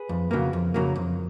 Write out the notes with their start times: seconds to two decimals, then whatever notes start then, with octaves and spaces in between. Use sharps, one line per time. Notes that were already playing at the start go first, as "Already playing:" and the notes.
Already playing: G#4 B4
0.09 F2
0.31 C#3 F#3 A#3
0.53 F2
0.74 C#3 F#3 A#3
0.96 F2